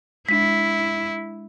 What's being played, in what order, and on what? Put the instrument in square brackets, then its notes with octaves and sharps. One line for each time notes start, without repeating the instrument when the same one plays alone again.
[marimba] G#3 D4 [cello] E4 [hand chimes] B6